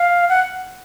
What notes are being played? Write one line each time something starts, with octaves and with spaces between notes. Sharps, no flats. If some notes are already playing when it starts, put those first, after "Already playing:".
Already playing: F5
F#5